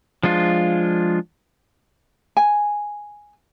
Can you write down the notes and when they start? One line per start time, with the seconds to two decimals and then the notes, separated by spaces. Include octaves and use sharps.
0.23 F3 G#3 D4 F4
2.37 G#5